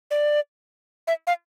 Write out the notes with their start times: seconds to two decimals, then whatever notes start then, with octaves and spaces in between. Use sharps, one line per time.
0.11 D5
1.07 E5
1.27 F5